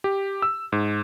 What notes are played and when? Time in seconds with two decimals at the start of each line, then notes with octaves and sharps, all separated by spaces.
0.04 G4
0.42 E6
0.72 G#2